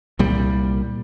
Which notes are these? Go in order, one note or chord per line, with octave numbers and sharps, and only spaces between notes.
C2 A#2 G3